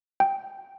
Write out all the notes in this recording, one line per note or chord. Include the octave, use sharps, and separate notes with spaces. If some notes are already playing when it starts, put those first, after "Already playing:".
G5